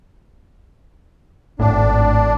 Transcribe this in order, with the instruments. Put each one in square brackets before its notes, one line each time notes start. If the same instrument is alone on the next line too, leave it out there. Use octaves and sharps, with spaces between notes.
[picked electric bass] G#1 A2 [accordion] D4